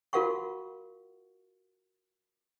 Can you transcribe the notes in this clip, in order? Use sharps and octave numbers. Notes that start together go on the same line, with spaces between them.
F4 F#4 A#4 F5 F#5 C#6